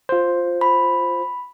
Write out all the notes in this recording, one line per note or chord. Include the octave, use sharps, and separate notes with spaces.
F4 C5
B5